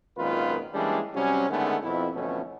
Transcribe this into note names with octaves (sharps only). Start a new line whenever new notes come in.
G#1 F#2 A#2 D#3 F4 B4
E3 G3 G#3 A#3 C#4 D4
C3 F#3 G3 C#4
D3 D#3 G#3 A3 B3 C#4
F2 B2 E4
F2 B2 D3 E3 A3 C#4